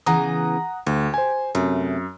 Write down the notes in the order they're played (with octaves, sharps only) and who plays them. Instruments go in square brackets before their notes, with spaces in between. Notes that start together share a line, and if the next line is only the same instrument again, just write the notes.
[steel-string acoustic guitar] C#3 E3 B3 [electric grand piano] F#5 A#5 D#6
[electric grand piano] D2 [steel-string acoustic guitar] G4
[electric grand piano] C5 G#5
[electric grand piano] F#2 [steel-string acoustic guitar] C3 A3